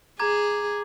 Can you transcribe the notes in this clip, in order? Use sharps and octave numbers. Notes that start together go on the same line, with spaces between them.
G#4 A#5 D6 G#6